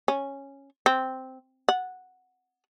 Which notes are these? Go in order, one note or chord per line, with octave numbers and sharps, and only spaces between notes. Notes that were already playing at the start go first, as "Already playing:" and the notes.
C#4
C4
F#5